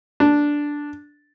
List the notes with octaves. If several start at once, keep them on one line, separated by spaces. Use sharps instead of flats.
D4